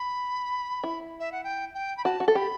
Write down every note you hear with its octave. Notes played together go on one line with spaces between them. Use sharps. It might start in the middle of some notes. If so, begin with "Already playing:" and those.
Already playing: B5
E4
E5
F#5
G5
G5
B5
F#4 A5
F#4
A4
G4 B5